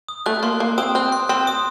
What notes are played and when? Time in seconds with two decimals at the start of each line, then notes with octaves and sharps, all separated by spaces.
0.09 D#6
0.26 A3 F#6
0.43 A#3 C6
0.60 A#3 C6
0.78 C4 D#6
0.95 C4 F#6
1.12 C6
1.29 C4 C6
1.47 D#6